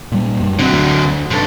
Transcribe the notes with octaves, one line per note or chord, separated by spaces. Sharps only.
A#2 G3
F#2 G3
D3 F#3 C4
D2
G2 C3 A4